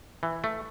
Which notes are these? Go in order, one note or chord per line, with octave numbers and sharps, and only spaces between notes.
E3
A3